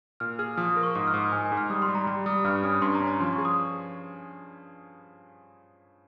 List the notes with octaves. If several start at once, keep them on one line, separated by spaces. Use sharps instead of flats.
A#2 F6
G#4 F6
F3 D#6
D#6
A#4
C#6
G#2 D#6
F6
G#2
D#6
G#2 G#5
G#5
G#2
F6
G3 D#6
C6
G3
A#5
G3 A#5
G3 D#6
G2 F6
C#4 D#6
G2 C6
A#5
C#4
A#5
F3 C6
C#6
G#4
D#6